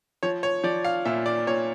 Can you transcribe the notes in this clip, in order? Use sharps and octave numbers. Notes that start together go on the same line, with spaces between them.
F3 C#5
C#5
F3 D5
F5
A#2 E5
D5
A#2 C#5